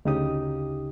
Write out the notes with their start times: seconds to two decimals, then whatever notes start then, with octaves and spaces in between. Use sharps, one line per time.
0.05 D2 C#3 D#4 G4 D#6